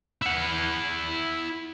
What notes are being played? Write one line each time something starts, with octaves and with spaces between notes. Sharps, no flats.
E4 F#5